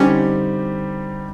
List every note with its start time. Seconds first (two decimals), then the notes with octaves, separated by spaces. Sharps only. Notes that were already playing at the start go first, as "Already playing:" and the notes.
Already playing: D3 G3 C4 C#4 D#4 G4